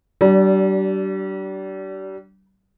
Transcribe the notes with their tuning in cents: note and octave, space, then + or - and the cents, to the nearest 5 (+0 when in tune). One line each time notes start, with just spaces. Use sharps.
G3 -35 D4 -10